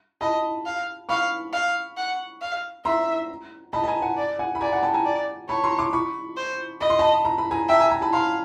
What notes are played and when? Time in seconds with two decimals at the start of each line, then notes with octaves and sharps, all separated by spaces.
0.21 D#5 A5 B5
0.66 F5
1.09 F5 B5 C#6
1.53 F5
1.97 F#5
2.41 F5
2.85 E5 A#5 C6
3.73 D#5 A5 B5
3.84 A5
3.88 G#5 A#5
4.02 F#5 G#5
4.17 D5
4.39 F#5 G#5
4.55 B5
4.61 D5 G#5 A#5
4.72 F#5 G#5
4.83 G5 A5
4.94 G#5 A#5
5.05 D5
5.49 C#5 A5 B5
5.64 A#5 C6
5.78 C6 D6
5.93 B5 C#6
6.37 C5
6.81 D#5 B5
6.90 C6
6.99 A5 B5
7.25 A#5
7.38 B5
7.51 G#5 A#5
7.69 E5 G5 A5
7.80 G#5 A#5
7.91 G#5 A#5
8.02 A5 B5
8.13 F5 A#5 C6